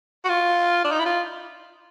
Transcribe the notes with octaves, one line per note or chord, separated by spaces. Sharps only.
F#4
F4
D4
D#4
E4
F4